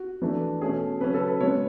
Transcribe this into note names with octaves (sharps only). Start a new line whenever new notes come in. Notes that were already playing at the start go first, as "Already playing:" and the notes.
Already playing: F#4
E3 A3 D4
B2 A3 C#4 G#4
C#3 F#3 C#4 B4
A4
B4
C#3 G#3 B3 C#5